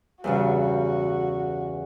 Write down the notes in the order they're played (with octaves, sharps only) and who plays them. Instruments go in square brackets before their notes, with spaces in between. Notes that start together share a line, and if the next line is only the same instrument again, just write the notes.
[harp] E2 G2 C#3 [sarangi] F#4